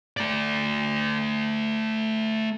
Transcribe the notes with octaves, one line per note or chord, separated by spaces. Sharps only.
A3 D5